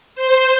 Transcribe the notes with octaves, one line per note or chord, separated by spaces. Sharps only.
C5